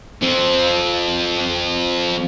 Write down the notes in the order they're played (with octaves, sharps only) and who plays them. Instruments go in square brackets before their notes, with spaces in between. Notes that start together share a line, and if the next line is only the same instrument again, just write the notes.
[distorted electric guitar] F3 C4